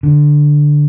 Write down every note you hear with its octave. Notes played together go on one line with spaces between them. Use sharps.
D3